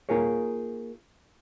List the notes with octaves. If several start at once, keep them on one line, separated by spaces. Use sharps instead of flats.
A#3 D#4 F4 G#4 A#4 C#5